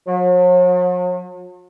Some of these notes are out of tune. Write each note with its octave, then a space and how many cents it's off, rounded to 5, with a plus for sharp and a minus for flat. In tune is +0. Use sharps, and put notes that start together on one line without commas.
F#3 -45